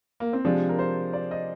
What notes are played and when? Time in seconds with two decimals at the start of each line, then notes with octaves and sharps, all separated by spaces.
0.20 A#3
0.33 C4
0.45 C3 F3 G#3 D4
0.69 A#4
0.79 C5
1.13 D5
1.31 D#5